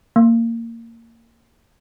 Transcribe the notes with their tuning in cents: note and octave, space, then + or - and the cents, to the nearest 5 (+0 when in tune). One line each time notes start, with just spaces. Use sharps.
A#3 -20